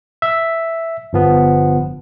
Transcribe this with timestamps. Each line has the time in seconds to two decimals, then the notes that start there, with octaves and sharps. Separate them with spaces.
0.22 E5
1.13 G1 F3 B3